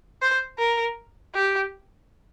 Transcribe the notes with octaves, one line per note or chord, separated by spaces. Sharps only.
C5
A#4
G4